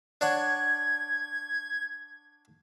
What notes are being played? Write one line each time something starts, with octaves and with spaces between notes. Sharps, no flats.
D4 C#5 F#5 G#6